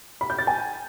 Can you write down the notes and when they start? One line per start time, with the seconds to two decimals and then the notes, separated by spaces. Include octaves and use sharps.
0.21 B5
0.30 G6
0.39 A6
0.47 G#5